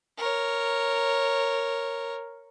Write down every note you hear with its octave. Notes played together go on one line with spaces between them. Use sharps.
A#4 C#5